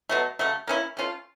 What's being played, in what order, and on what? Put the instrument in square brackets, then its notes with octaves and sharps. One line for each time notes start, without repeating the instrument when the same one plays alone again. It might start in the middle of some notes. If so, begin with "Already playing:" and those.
[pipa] B2 F#3 A3
C#3 F#3 A3
A#3 C#4 E4
A3 C#4 F4